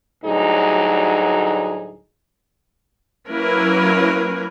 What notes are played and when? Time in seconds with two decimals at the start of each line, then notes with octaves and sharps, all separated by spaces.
0.25 D2 A2 F#3 G3 D#4 G#4
3.30 F#3 A#3 C#4 E4 A#4 B4